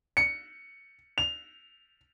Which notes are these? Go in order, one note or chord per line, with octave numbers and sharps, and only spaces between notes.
C#7
F7